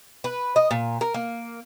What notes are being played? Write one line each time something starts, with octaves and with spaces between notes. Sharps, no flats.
B4
D#5
A#2
A#4
A#3